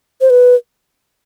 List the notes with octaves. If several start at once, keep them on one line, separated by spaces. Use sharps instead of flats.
C5
B4